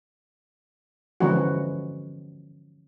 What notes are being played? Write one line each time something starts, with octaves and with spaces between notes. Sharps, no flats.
D3 E3 F3 G#3 C#4 F#4